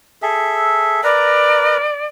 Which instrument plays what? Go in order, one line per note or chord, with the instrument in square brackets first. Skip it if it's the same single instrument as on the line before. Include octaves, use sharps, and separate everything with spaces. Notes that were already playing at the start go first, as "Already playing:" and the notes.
[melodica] G#4 A4 E5
[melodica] A#4 B4 A#5 [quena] D5